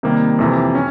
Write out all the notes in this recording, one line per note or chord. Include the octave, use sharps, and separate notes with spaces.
C3 D#3 G3 A#3
F2 C3 E3
C#4